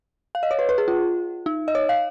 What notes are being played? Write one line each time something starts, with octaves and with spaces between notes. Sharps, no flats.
F5
D#5
C#5
B4
B4
G#4
F4
D#4
D#5
C#5
F5